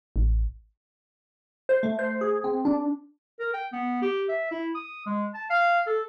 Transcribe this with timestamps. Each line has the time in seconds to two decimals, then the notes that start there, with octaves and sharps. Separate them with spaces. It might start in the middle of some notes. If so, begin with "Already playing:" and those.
0.16 A1
1.69 C5
1.83 A3
1.99 C5
2.21 G#4
2.44 C4
2.65 D4
3.40 A#4
3.54 G5
3.72 B3
4.02 G4
4.29 E5
4.51 E4
4.75 D#6
5.06 G#3
5.34 A5
5.50 F5
5.87 A4